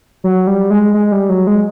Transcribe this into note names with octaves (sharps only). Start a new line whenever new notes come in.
F#3
G3
G#3
G#3
G3
F#3
G#3